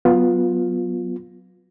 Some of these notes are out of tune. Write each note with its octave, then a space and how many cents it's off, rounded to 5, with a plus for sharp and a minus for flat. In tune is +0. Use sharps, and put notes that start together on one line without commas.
F#3 +0 B3 +0 F4 +10